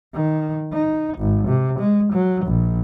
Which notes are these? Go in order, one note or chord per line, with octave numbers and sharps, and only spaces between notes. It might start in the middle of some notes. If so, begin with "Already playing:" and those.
D#3
D#4
G#1
C3
G#3
F#3
A#1